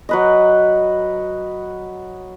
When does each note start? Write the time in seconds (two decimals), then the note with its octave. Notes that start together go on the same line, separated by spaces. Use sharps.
0.09 F#3 B4 D#5